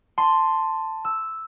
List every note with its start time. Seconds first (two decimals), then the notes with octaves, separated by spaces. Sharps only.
0.18 A5 C6
1.05 E6